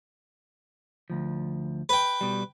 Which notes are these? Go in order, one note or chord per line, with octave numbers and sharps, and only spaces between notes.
D2 F3
B4 G5
B2 G3